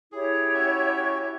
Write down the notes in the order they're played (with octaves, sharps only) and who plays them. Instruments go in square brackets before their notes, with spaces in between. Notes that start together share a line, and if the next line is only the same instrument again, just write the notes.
[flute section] E4 G4 C#5 [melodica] G#4
[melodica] C#4 F#4 E5